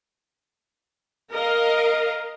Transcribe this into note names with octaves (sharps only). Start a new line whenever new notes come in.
A#4 D#5 F5